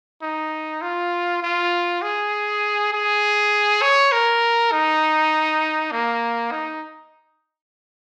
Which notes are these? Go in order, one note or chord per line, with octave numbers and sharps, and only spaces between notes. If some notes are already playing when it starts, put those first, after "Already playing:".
D#4
F4
F4
G#4
G#4
C#5
A#4
D#4
A#3
D#4